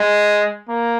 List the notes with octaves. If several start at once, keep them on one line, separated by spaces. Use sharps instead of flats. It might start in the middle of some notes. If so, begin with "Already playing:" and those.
Already playing: G#3
A#3